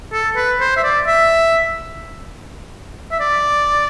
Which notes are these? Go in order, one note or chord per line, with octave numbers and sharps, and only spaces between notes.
A4
B4
C5
E5
D5
E5
E5
D5